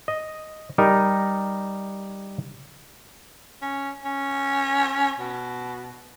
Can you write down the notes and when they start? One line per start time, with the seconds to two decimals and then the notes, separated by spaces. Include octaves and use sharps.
0.08 D#5
0.78 G3 D#4 A#4
3.62 C#4
4.05 C#4
5.19 B2